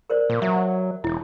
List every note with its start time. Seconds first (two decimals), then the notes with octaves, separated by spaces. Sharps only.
0.10 A#4 C5 D5
0.29 A#2
0.42 F#3 E5
1.04 E1 E4